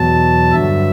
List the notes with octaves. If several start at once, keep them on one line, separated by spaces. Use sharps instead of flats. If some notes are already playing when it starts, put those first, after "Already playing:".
Already playing: E2 B2 F#3 A5
G2 D3 F#3 E5